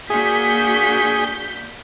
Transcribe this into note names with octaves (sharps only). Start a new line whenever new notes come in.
A#3 D4 F#4 G#4 G6 B6